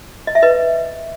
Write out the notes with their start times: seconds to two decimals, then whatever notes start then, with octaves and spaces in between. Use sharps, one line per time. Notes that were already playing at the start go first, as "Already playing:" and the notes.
0.27 D#5
0.35 E5
0.42 B4 D#5